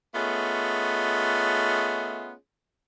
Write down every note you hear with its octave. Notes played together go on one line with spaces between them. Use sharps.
A3 B3 C#4 F4 G#4 D#5